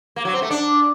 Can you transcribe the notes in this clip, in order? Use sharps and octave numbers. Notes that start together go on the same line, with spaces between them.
A#3
F#3
C4
A3
D4